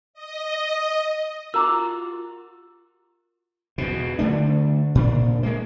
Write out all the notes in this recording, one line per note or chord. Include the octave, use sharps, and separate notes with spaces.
D#5
F4 F#4 A#4 A#5 D6 E6
E2 B2
D3 A3 D4
A#2 D4
G#3 A#3